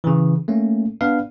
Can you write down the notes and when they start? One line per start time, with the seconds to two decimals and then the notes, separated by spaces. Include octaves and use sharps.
0.04 C#3 E3
0.48 A3 A#3 C#4
1.01 B3 D4 B4 F5